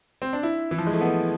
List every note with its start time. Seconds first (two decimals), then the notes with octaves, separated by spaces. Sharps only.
0.22 C4
0.33 D4
0.43 E4
0.71 E3
0.78 F3
0.87 G#3
0.93 A3
1.01 B3